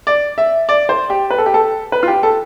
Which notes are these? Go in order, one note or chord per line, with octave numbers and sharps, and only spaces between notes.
D5
E5
D5
C5
G4
B4
A4
G4
A4
B4
F4
G4
A4